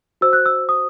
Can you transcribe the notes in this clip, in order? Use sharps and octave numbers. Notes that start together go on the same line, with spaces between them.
F#4 C5 E6
F#6
E6
D#6